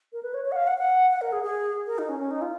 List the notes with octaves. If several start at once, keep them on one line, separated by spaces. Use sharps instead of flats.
A#4
B4
C#5
C#5
F#5
F5
F#5
F#5
F#5
A#4
G#4
G#4
A#4
D#4
C#4
C#4
D#4
F4